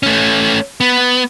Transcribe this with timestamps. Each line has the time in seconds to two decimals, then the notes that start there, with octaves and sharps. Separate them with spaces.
0.03 A3 C#4
0.81 B3